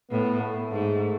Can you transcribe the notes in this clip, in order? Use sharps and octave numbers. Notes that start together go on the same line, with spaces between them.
A2 B3
A3
G#2